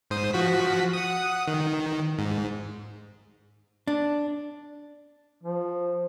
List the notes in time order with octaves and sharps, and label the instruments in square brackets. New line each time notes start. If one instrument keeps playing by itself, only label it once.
[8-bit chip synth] G#2 C5 D#6
F3 F#4 B6
F#5 D#6
D#3
G#2
[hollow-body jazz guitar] D4
[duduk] F3